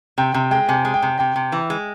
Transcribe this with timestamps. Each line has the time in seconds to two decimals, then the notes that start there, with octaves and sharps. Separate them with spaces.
0.18 C3 G5
0.34 C3 G5
0.51 G#3 G5
0.69 C3 G#5
0.85 G#3
0.94 G5
1.02 C3
1.19 C3 G5
1.36 C3
1.52 E3
1.70 G#3